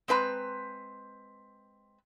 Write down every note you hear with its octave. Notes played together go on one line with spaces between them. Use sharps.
G#3 C4 B4 G#5 A#5